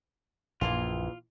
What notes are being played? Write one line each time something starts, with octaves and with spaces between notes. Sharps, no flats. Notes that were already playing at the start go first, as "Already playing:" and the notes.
A#1 F#2 A#2 E3 F4 G#4